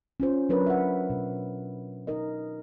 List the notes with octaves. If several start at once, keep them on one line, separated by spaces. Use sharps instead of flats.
C#4 F4 C5
F#3 D4 A#4 B4 C#5
E5 F#5
B2
D#4 A#4 D#5